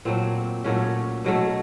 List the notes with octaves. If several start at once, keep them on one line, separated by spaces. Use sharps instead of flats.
A#2 F#3 A3 C4
A#2 F#3 A3 C#4
B2 F#3 A3